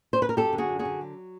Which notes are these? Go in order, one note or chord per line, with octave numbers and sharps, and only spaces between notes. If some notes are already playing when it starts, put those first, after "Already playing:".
C5
B4
A#4
F#2 G4 A4
D3
F#4 G#4
F#2
F#4 G#4
D3
F#3